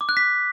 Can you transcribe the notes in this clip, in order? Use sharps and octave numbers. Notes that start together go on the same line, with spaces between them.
D6
F#6
B6